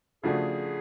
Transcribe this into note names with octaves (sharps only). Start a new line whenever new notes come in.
C#3 F3 A3 D4 F#4 G#4